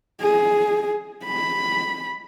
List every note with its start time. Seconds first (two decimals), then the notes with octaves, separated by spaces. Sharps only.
0.21 G#4
1.25 B5